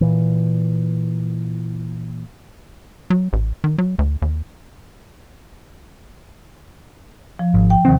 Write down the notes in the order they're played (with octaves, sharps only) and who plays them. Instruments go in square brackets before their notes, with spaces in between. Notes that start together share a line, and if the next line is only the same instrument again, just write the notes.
[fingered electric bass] A#2 E3
[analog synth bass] F#3
A1
D#3
F#3
D2
D#2
[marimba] F3
[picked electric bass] G#1
[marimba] G5
[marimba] D#2 C3 [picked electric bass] D#3 C4